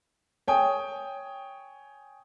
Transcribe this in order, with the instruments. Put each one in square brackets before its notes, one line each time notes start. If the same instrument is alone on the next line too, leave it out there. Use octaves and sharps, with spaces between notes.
[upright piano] C#5 G5 G#5 D#6